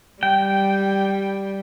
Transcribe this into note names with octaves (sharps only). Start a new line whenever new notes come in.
G3 G5